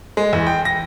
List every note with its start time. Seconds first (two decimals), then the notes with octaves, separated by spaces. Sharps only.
0.17 G#3
0.33 E2
0.47 G5
0.65 A#6